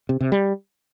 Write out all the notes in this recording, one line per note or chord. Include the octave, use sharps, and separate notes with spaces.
C3
C3
G3